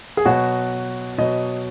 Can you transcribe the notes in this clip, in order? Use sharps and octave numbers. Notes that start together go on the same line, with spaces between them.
G#4
B2 F#3 F#4
B2 F#3 D#5